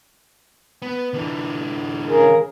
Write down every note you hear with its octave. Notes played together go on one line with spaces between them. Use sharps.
B3
D3 E3
C#3 G#4 A#4